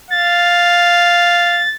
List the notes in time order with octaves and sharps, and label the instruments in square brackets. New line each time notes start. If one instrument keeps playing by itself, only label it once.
[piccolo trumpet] F5 [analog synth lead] A6